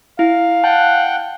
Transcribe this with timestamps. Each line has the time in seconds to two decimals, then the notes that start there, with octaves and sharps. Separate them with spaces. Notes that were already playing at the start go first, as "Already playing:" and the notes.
0.19 E4 F5
0.64 F#5 G5 A5 F#6